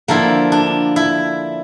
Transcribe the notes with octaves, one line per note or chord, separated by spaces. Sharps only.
D3 F3 A#3 E4
D4
E4